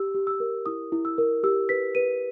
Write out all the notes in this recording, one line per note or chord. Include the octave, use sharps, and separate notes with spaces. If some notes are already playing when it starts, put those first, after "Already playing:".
Already playing: G4 E6
G4
E6
A#4
E4 D#6
E4
E6
A#4
G4 E6
B4 B6
B4 D#7